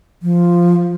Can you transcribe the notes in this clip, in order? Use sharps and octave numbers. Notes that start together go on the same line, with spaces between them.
F3